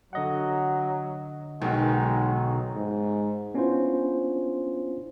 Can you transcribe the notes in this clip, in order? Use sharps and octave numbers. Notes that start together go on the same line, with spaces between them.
D3 F#3 D#5 F#5
B1 D#3 F#3 G#3
G#2
B3 C#4 D4 E4 F4 C5